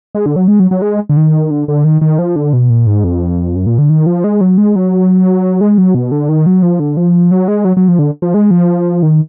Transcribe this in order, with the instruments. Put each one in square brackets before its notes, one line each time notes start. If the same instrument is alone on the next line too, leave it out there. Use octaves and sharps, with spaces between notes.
[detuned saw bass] G#3
D3
F#3
G#3
F#3
F#3
G#3
D3
D#3
D3
D3
D#3
D#3
F3
D3
B2
A#2
G#2
F2
F#2
A#2
D3
D#3
F3
G#3
F#3
G#3
F#3
G#3
F#3
B2
D3
D#3
F#3
F3
D3
F3
F#3
G#3
F#3
F#3
F3
D3
F3
G#3
F3
D#3